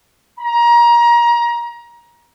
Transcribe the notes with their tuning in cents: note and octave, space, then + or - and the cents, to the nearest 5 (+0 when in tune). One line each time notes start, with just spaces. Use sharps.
A#5 +25